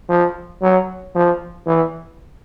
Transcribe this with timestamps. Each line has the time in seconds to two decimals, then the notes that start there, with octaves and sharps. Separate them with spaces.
0.09 F3
0.62 F#3
1.15 F3
1.67 E3